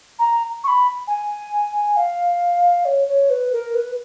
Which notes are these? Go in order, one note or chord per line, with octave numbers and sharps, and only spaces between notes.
A#5
C#6
B5
G#5
F5
C#5
C#5
B4
A#4
B4